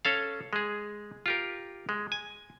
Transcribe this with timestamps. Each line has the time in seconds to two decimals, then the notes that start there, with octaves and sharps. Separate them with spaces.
0.05 C#4 A4 F5
0.53 G#3 G#4
1.26 F4 G4 A#4
1.89 G#3
2.12 G#5